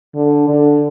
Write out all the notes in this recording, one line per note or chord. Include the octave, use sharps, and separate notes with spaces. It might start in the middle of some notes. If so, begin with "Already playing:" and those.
D3
D3